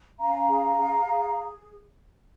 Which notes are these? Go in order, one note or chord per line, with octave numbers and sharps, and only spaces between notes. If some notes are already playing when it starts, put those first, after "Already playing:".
C#4 F5 A#5
G#4
G#4
G#4